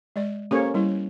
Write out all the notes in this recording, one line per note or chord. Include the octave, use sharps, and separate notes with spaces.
G#3 D5
A#3 C#4 G4 A4 C5 C#5
G3 E4